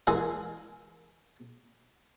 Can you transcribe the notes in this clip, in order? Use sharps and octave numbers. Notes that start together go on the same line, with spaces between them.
E3 G#3 E4 A#4